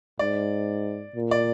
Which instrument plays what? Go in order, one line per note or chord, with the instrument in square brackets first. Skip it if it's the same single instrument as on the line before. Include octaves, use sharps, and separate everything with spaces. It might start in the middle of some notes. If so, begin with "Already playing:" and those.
[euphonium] G#2 [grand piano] D5
[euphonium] A#2
[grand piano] D5